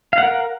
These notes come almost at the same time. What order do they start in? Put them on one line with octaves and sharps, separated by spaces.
F5 F#5 A#4